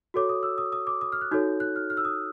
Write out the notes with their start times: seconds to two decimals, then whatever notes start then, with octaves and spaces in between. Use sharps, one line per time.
0.14 F#4 A4 C#5 D6
0.29 D#6
0.43 E6
0.58 D#6
0.72 D#6
0.87 D6
1.01 D#6
1.12 F6
1.21 F#6
1.31 D#4 F#4 A4 C#5 G6
1.60 F#6
1.76 F6
1.90 F6
1.97 E6
2.05 D#6